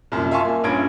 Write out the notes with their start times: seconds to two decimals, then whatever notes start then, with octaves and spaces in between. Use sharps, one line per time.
0.12 C2 F#2 A#2
0.31 E5 F5 G#5 A5 C6 C#6
0.45 A#3
0.64 A#1 G2 C#4 F4 G#6 D7